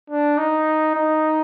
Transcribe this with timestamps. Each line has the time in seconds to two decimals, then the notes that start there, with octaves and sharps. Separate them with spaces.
0.10 D4
0.38 D#4
0.95 D#4